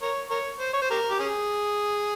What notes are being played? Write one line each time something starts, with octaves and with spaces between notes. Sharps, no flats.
A#4 C#5
A#4 C#5
C5
C#5
C5
G4 A#4
G4
C#4 G#4